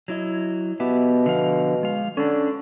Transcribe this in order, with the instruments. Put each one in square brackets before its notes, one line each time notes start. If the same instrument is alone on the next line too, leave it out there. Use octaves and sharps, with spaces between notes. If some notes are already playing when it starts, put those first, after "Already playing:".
[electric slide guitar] F#3 E4 D#5
[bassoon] B2 [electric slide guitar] B3 G4 E5
[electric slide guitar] D3 F3 F5
G#3 F5
[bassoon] D3 [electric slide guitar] C#4 D4